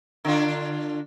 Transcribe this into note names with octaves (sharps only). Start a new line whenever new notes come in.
D3 D4 F4